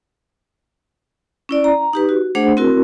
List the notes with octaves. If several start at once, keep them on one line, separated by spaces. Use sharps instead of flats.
C#4 E4 D5
A#5
D#4 G4 B4
F#4
A3 D4 G#4 C5 F#5
C4 E4 F#4 A#4